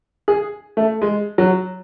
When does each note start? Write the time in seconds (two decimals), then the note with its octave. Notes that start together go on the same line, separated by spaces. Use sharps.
0.28 G#4
0.77 A3
1.02 G#3
1.38 F#3